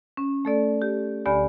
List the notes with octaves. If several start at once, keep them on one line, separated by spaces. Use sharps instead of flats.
C#4
A3 A4 D5
G4
D2 D3 G4 D5 G#5 B5